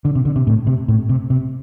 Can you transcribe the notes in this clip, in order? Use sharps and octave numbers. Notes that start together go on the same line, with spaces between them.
D3
C3
D3
C3
A2
C3
A2
C3
C3